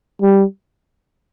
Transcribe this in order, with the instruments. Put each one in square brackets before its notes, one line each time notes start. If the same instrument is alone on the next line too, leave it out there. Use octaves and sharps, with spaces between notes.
[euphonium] G3